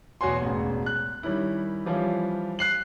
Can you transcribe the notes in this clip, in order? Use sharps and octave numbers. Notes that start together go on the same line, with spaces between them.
E2 B2 F#4 C#5 G#5 C6
E1 A1
F#6
D#3 G3 C#4 E4
E3 F3 G3 C#4 F4
F#6 C7 F#7